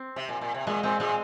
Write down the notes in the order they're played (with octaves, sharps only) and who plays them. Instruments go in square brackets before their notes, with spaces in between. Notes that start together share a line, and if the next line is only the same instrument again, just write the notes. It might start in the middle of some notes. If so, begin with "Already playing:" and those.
Already playing: [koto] C4
[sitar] C3
A#2
A#2
C3
[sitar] A#2 [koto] G#3
[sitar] A#2 [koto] C4
[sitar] A#2 [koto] G#3